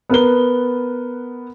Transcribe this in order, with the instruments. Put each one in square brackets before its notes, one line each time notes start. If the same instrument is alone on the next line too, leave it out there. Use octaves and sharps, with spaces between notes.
[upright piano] B3 A#4 B4 G7